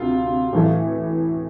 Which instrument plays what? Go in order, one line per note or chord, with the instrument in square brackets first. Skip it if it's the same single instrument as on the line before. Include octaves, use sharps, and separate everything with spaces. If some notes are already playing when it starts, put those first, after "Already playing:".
Already playing: [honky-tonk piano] D2 C3 [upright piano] F4
[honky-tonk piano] A2 E3 A3